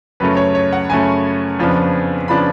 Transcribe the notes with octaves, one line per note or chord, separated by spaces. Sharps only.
F#2 C#3 F#3 A3 B4
C#5
C#5
F#5
F#2 C#3 F#3 A3 G#5
F2 C#3 F3 B3 D4
C#3 F3 B3 D4 B5